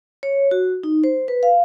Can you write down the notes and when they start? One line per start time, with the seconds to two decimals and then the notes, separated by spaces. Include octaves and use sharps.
0.23 C#5
0.51 F#4
0.84 D#4
1.04 C5
1.28 B4
1.43 F5